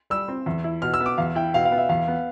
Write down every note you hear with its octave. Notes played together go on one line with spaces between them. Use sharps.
G3 E6
C4
E2
E4
B2 F6
E6
B3
D6
E2 F5
E4 G5
B2 F5
F5
B3
E5
E2 F5
B3